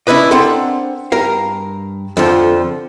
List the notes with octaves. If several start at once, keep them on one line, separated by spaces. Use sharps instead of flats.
C#4 D4 E4 B4 D#5
C4 D4 A4 A#4 F#5 C6
G2 A#4 F5
F2 D3 F3